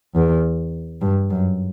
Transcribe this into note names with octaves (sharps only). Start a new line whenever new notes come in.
E2
G2
F#2